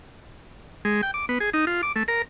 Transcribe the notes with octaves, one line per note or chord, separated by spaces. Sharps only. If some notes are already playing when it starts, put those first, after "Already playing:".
G#3
G5
D6
B3
G#4
D#4
F4
D6
A3
A#4